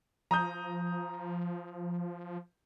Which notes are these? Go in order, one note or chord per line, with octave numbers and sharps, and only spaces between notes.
F3 A#5 D#6 G6